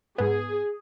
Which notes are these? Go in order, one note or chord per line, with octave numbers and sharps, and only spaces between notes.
G#2 B3 G#4